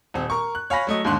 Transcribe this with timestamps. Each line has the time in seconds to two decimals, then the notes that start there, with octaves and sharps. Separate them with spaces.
0.14 D#1 C4
0.30 A#4 C#6
0.55 F#6
0.70 C#5 F5 G#5 B5 A#6
0.87 F#3 A3 D#5
1.04 D#2 G#2 D3 C6 F#6